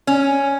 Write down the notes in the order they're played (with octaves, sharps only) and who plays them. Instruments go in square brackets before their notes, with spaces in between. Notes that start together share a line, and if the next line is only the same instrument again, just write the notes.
[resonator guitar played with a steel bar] C#4